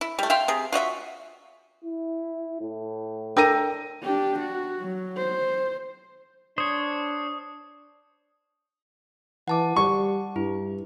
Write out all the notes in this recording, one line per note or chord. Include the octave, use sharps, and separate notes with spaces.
E4
G3 A3
E5 F5 G5 C6
C3 G#4
F4 F#4 D#5 E5
E4
A2
D4 A4 A#4 G5 A#6 D#7
D4 G4
F#4
F#3
C5
D4 C5 C#5 D#6
E3 F#5 A5 D6
G3 C#6
G2 E4